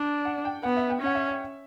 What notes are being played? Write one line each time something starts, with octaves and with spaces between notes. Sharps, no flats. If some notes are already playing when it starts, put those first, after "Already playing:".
Already playing: D4 D5
F#5
G5
B3 F#5
E5
G5
C#4 F#5
E5
E5